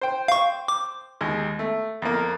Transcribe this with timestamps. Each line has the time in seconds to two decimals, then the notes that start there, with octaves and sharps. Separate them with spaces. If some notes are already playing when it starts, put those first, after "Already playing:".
0.01 C5 G5
0.28 F5 C#6
0.68 D6
1.21 D#2 G#3
1.59 A3
2.02 F2 A#3